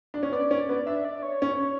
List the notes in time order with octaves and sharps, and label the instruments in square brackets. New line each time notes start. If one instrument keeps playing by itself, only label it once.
[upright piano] D4
C#4
[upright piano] B3 [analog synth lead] D5
[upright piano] C#4
B3
[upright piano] D4 [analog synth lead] E5
[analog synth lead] D5
C#5
[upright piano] C#4